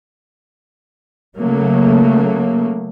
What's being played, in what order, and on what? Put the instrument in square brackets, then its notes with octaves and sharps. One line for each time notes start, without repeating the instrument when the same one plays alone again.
[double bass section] C#3 F#3 A3 A#3